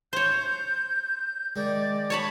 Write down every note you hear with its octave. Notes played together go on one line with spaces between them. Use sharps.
C5 C#5 G6
D#3 G#3 D5
C#5 A5 B5 C#6